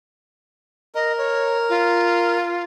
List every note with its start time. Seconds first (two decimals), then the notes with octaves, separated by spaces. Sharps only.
0.95 A#4 D#5
1.18 C#5
1.69 F4